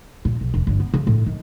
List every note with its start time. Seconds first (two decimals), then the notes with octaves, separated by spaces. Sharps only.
0.25 A#2
0.41 B1
0.54 E1
0.67 G1
0.80 B3
0.94 C#3
1.07 A2
1.26 D#3